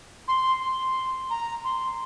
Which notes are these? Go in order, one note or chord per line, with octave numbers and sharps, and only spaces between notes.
C6
C6
A#5
C6